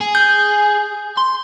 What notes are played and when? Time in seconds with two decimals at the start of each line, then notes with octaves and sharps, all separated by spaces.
0.01 G#4
0.15 G6
1.18 C6